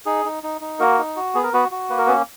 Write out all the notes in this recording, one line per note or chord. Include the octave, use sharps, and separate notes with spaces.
D#4 G#4
D#4
D#4
D#4
A#3 F#4 A#4
D#4
F#4
B3 G#4
A#4
B3 F#4 B4
F#4
A#3 B4
A#4
B3 C#4 B4